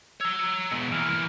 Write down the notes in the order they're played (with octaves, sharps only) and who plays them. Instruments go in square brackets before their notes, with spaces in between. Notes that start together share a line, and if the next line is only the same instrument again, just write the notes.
[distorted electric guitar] C#5 A#5 [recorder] E6
[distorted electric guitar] B2 G#3
[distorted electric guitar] E3 A#3 [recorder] F6